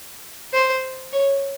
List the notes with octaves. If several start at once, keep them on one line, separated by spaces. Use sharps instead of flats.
C5
C#5